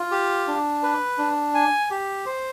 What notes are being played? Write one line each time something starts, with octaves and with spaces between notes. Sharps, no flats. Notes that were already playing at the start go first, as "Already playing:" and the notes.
Already playing: F4
G4
D4
B4
D4
G#5
G4
C5